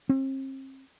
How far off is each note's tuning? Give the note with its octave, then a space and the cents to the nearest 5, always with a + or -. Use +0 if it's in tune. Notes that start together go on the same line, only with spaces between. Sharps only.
C4 +40